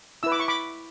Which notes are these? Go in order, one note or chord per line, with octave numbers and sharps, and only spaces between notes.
E4 B4 E6
D6
C#6
B5 D6